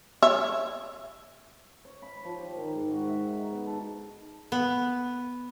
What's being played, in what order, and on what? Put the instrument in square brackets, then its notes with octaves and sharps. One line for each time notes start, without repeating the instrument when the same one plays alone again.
[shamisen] C#5 E5
[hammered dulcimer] C#5
B5
F3
G4
D#3
G#2
F#4
E5
D#4
B3
A4
[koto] B3